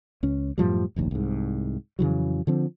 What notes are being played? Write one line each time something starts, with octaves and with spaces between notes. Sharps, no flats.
C#2 C#4
F#2 A2 F3 G3
F1 A#1 D#2
C2 G#2
F2 C#3 E3 F#3
D3 F3 C4